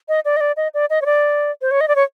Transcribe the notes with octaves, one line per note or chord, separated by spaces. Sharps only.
D#5
D5
D#5
D5
D#5
D5
D#5
C#5
D5
C5
C#5
D#5
D5
C#5